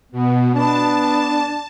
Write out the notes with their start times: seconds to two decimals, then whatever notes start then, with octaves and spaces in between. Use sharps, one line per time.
0.12 B2 B3
0.54 B3 D4 A5